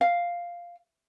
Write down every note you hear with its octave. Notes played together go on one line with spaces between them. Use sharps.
F5